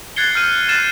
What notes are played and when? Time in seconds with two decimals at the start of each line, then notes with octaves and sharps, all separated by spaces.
0.16 F#6 G#6 A6 C7 C#7 G7
0.35 F6 G6 D#7
0.69 F6 F#6 A6 C7 E7